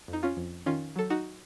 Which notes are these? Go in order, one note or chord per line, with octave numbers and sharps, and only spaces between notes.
F2
D#4
C#4 F4
F2
D#3 C#4 F4
F#3 A4
D#4 F#4